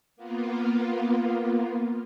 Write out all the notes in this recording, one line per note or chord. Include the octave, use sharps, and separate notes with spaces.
A#3 B3 F4